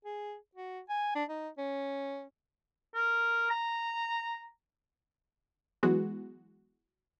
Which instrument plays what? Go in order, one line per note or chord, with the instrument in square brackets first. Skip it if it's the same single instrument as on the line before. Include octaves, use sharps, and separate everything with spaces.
[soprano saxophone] G#4
F#4
G#5
D4
D#4
C#4
[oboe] A#4
A#5
[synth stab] E3 F#3 G#3 B3 F#4